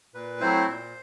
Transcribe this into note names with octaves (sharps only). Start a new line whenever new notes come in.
A#2 B4
F#3 A3 C4 E4 C5
A#2